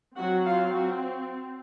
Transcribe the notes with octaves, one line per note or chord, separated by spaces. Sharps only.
F#3 C4 F#4 F#5
F4 F5
F#3 F#4